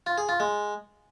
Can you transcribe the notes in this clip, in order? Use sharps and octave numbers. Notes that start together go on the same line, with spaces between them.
F4
G#4
F4
G#3